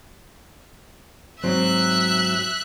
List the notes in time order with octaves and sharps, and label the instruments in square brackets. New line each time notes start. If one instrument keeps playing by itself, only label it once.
[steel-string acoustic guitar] G#2 F#3 C4 [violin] E5 F#6